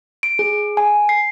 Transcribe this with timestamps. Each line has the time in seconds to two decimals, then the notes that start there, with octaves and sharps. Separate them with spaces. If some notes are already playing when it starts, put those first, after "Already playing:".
0.23 D7
0.39 G#4
0.77 G#5
1.09 C7